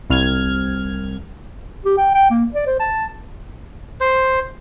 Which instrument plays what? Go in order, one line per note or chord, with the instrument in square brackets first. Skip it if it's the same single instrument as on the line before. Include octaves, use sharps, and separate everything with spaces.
[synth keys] C2 F6 G#6
[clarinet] G4
G5
G5
A#3
D5
C5
A5
[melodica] C5